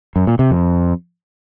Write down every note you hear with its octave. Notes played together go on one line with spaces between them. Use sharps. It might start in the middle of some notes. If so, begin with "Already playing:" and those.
F#2
A#2
C3
F2